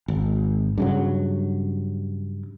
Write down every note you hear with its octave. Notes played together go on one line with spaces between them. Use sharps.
G#1
G2 C#3 F#3